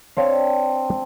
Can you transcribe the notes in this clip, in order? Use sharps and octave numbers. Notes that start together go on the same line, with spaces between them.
C4 D4 C#5 F5